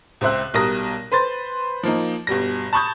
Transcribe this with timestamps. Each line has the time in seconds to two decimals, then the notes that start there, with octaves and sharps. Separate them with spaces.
0.21 C#2 C4 C5 E5 F#6
0.54 B1 G3 A#4 D#6 A#6
1.12 B4 C5 C6 A6
1.83 F3 A#3 D#4
2.27 G1 B2 G3 A#6
2.73 A5 B5 C#6 D#6 G6 G#6